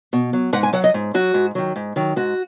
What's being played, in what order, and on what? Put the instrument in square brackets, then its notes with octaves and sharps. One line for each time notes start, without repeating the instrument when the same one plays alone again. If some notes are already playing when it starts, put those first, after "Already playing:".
[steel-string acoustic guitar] B2
F#3
G#2 F#5
G#5
F#3 F#5
D#5
G#2
F#3 F#4
G#2
D#3 F#3
G#2
D#3 F#3
G#2 F#4